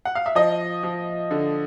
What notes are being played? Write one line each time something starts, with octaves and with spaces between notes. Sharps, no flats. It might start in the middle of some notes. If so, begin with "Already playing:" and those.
F#5
F5
E5
F3 D#5
F3
D3